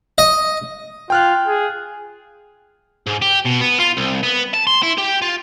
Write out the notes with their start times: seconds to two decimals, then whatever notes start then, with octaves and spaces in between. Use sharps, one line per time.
0.18 D#5
1.10 F4 G5 F6 F#6
1.47 G#4
3.07 G#2
3.22 G4
3.45 B2
3.61 B3
3.79 F4
3.97 C2
4.23 B3
4.54 A5
4.67 C6
4.83 E4
4.98 G4
5.22 F4